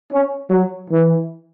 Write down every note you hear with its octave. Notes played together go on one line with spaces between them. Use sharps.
C#4
F#3
E3